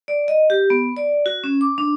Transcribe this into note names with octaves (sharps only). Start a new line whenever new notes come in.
D5
D#5
G4
B3
D5
F#4
C#4
D6
D4